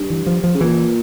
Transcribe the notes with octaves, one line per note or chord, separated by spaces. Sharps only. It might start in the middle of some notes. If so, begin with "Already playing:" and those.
Already playing: G2
E3
F3
F3
C#3
A#2 E3